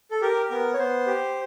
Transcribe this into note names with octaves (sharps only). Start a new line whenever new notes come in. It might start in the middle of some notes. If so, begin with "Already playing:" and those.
A4
G4 A#4
B3 A#4
C#5
B3 C5
G4